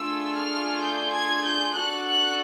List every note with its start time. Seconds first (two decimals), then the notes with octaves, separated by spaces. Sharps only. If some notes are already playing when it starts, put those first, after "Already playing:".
Already playing: A3 D4 F4 G#4 E6
0.34 F6
0.81 G6
1.12 G#6
1.44 G6
1.75 D4 F#4 A4 F#6
2.05 F#6